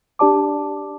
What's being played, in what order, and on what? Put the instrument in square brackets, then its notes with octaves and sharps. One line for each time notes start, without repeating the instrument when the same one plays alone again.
[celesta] D4 G4 D5 A5 D6